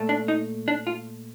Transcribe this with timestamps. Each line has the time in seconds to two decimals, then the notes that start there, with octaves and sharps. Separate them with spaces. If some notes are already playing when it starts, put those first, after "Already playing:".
Already playing: A#2 A3
0.09 D4
0.28 D#4
0.68 D4
0.87 F4